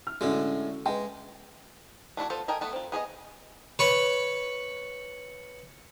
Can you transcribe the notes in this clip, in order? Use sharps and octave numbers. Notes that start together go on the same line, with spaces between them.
F6
A2 D3 G#3 C#4 F#4
G#3 B4 D#5 G5
A3 D4 E4 F#4
B3 F4 A4 C5
A4 A#4 D#5 G5 G#5
A3 B3 A4
C4 F4
B3 G#4 B4 D#5
B4 C#5 B5